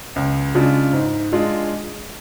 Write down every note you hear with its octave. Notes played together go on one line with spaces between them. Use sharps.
C#2
C#3 G#3 D4 F4
G#2
G#3 D4 F4